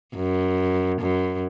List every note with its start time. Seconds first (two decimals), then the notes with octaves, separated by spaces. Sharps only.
0.15 F#2
1.01 F#2